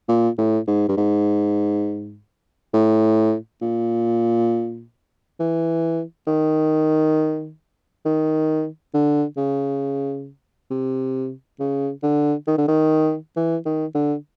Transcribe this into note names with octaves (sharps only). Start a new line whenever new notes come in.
A#2
A2
G#2
G2
G#2
A2
A#2
E3
D#3
D#3
D3
C#3
C3
C#3
D3
D#3
D3
D#3
E3
D#3
D3